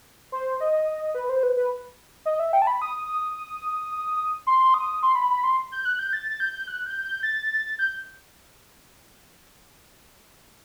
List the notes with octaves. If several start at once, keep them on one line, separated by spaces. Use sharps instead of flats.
C5
D#5
B4
C5
B4
B4
D#5
E5
G5
A5
B5
D#6
C6
D#6
C6
B5
B5
C6
G6
F#6
G6
A6
A6
G6
F#6
G6
G6
A6
G6